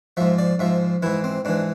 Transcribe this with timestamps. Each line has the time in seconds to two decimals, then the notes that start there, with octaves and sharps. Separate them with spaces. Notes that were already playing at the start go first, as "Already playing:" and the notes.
0.17 G#2 F3 E5
0.39 D5
0.59 G#2 F3 E5
1.02 G#2 E3 E4
1.24 C4
1.45 G#2 E3 D4